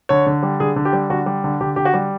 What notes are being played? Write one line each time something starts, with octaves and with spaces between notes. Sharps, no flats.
D3 C#5
D3
G3
D3 G#4
D3
G4
G3
D3 F#4
G3
D3
D3 G4
D3 G4
F#4
G3